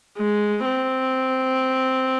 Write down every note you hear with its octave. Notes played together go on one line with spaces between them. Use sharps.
G#3
C4